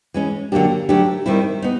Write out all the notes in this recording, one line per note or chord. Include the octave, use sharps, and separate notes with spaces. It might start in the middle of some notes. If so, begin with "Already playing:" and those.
E3 G#3 C#4
D3 F#3 A#3 D4 G4
F#3 A3 D4 G4
D#3 G3 C4 E4
B3 D#4